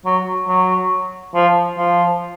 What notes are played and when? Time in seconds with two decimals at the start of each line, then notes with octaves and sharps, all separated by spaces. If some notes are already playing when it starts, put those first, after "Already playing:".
0.05 F#3
0.48 F#3
1.34 F3
1.78 F3